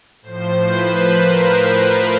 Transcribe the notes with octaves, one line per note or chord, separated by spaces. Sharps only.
A2 F3 C5
B4
A#4
A#4